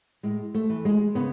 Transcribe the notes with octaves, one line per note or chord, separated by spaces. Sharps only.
A2 G#3
A3
E3
G#3
C#3 B3